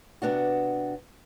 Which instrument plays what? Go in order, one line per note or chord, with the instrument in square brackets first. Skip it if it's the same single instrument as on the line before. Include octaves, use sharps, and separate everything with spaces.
[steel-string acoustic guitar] C3 B3 D4 F#4